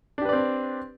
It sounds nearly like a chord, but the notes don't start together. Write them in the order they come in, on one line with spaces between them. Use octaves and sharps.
D4 G4 B4 D5 C4